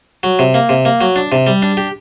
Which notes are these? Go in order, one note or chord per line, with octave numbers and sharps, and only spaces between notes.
F#3
C3
A#3
C3
A#3
F#3
D4
C3
G3
D4
G4